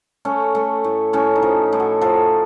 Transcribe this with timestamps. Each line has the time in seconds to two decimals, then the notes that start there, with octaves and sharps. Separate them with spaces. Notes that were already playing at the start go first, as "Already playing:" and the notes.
0.25 A3 C#4
0.55 A3
0.84 A2
1.13 A2 C#4
1.36 D#4
1.42 F3
1.73 A2
1.80 F#4
2.01 F3 A4